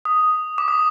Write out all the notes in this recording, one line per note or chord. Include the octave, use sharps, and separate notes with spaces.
D#6
D6
D#6